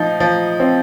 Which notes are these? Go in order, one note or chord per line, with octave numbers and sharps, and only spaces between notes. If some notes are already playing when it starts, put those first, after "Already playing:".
Already playing: F3 D#4
F3
C4